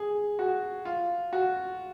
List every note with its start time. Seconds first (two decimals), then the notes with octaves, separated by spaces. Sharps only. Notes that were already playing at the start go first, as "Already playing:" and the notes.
Already playing: G#4
0.39 F#4
0.85 F4
1.33 F#4